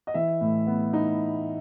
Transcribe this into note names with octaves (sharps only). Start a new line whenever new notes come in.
D#5
E3 E5
A2
B3
D#4